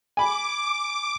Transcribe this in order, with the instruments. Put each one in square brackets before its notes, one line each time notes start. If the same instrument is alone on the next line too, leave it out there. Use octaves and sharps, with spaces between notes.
[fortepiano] G#5 B5 [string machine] D6